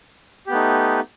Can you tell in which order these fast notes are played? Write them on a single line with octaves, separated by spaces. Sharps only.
G4 B3 A3 D#4